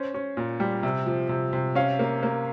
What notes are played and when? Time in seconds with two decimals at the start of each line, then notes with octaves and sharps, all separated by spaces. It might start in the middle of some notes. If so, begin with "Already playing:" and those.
Already playing: C#4 C5
0.14 C#4
0.37 A#2
0.60 G3
0.83 C3
1.06 F3
1.29 C3
1.53 C3
1.75 C#4 F5
1.99 A#3
2.23 A#3